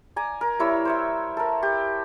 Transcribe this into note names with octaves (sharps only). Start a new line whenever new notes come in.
D5 G#5 A#5
A#4
G3 E4 C#5 E6
C5 C#5 E5
A4 A#4
G4